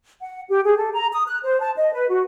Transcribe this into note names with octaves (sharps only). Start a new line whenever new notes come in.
F#5
G4
G#4
A4
A#5
D#6
F#6
C5
A5
D#5
B4
F#4